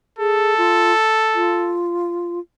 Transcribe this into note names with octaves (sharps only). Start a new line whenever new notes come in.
G#4 A4
F4
F4